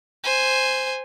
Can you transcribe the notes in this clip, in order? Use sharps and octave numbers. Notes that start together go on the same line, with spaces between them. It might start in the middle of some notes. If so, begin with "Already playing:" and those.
C5 G#5